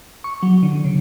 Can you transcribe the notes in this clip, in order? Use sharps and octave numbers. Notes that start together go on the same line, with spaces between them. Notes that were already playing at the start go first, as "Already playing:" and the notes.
C#6
F#3
D3
C#3